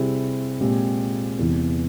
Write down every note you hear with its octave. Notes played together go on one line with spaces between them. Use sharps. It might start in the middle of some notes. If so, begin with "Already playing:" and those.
Already playing: C3 G3 C4 E4 G#4
A#2 G#3 C4 G4
E2 C3 E3